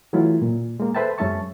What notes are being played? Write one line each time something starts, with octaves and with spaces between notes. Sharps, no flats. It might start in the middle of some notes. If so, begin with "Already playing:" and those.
E3 F#3 A3 E4 F4
A#2
G#3 A#3
A4 B4 C5 E5 G5 A5
F#2 G#3 C#4 E5 A5 C#6